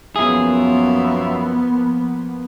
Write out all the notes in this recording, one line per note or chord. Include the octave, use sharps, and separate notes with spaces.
F#2 F3 A#3 B3 F4 G#4 E5